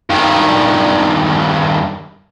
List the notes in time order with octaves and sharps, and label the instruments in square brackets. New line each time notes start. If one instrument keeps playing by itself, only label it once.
[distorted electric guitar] G2 D#3